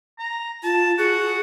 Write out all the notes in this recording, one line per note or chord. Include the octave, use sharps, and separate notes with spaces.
A#5
F4 A5
F#4 G#4